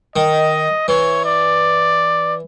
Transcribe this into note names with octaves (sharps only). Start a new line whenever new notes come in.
D#3 D#5
E3 C#5
D5